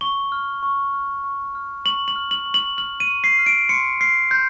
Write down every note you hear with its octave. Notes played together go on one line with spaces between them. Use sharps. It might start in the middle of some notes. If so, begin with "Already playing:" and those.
C#6 G7
F6
C#6
F6
C#6
F6
C#6 F#7
F#7
F6
F#7
C#6
F#7
F6 F#7
D#7
C#6
C7
F6
D7
C6 C#7
F6 C7
C6 G6